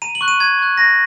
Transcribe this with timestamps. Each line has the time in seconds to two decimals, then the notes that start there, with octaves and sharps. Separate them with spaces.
0.02 A#5 D#7
0.15 F#7
0.21 C#6 F#6
0.28 D#7
0.40 A#5 G#6
0.59 C#6 F#6
0.77 A#5 A#6